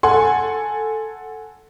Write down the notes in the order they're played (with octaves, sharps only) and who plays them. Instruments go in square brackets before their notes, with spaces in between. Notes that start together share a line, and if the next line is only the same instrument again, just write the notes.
[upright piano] A4 F#5 G#5 C6